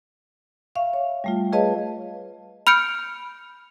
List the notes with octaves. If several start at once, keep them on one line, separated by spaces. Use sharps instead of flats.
E5 F5 C#6
C#5
G3 A3 F4
G#4 B4 C#5 D#5 F5 A5
B5 F6 G6 C#7 D7